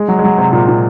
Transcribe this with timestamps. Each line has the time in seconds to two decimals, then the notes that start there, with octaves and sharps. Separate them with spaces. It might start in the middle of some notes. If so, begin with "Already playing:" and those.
Already playing: G#3
0.08 F#3
0.19 G#3
0.24 F#3
0.38 C3
0.53 A#2
0.68 A#2